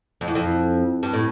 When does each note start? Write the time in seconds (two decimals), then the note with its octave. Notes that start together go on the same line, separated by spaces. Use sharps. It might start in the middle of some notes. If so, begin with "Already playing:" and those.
0.21 F2
0.28 E2
0.35 F2
1.03 G2
1.13 A2